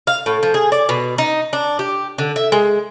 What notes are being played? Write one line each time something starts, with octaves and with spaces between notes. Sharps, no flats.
F5
A2
F3
G#4
D5
B2
D#4
D4
G4
D3
E5
G#3